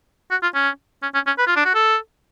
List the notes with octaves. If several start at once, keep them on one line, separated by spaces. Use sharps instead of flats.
F#4
F4
C#4
C#4
C#4
C#4
B4
F4
D4
F#4
A4